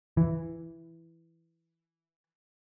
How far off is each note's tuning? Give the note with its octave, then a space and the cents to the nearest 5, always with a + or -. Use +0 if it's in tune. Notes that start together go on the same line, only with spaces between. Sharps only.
E3 +5